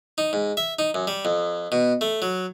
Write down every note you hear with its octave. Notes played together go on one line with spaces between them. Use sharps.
D#4
G#2
E5
D#4
F#2
G3
F2
B2
A3
F#3